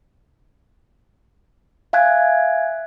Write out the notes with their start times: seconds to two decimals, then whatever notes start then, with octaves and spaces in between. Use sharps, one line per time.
1.93 E5 F5 G#5 F#6 G#6